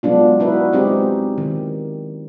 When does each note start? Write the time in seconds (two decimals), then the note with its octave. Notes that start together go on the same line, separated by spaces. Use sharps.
0.03 F#3 G#3 B3 D4 F4
0.40 D#4 E4 F#4 B4
0.73 G#3 C4 D#4 G4
1.38 D#3